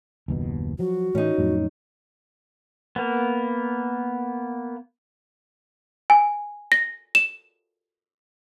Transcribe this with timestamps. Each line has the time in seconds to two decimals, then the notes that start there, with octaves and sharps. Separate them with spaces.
0.28 F#1 D#2 B2
0.79 F3 F#3 F#4
1.15 A2 E3 A3 C#4 D#4
1.38 F2 A2 F#3
2.96 A#3 B3
6.10 G#5
6.72 A#6
7.15 E7